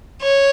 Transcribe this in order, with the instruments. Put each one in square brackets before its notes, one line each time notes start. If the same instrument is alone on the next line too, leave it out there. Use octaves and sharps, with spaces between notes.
[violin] C#5